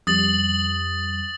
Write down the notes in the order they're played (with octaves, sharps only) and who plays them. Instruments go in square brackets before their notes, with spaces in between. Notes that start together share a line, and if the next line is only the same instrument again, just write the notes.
[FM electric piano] F2 G3 [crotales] D#6 A6 F#7